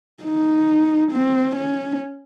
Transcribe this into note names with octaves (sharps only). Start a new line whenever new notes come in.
D#4
C4
C#4